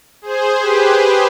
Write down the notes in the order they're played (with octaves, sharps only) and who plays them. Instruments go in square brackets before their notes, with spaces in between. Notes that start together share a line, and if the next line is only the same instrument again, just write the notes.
[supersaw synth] G#4 C5
G4 B4